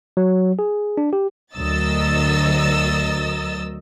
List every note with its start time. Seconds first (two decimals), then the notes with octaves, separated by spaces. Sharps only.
0.17 F#3
0.59 G#4
0.98 D4
1.13 G4
1.55 D2 F#3 A#4 D#5 E6 A6